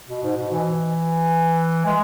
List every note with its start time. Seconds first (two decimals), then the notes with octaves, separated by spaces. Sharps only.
0.08 B2
0.23 G#2
0.37 B2
0.52 E3
1.85 G#3